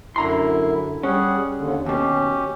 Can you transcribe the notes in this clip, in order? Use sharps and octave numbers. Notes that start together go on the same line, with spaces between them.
F#2 D3 E4 A#5 C6
G3 C#4 G#4 F#5
D#2 D3
D#2 B2 C#4 G4